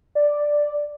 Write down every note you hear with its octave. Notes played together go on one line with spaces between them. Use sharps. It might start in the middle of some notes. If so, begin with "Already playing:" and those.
D5